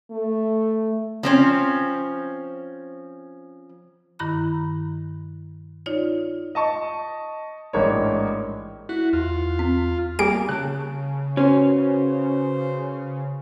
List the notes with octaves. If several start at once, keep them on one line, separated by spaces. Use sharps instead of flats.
A3
F3 C4 C#4
G2 D#3 E4 A#5 B5 F#6
D#4 F4 C#5 D5
D#5 A5 C#6
A1 G#2 A#3 D4 C#5
E4 F#4
E2 F4
C4
G3 A#3 G#4 D7
C#3 A5 F#6
C#4 F#4 B4 C5 G#5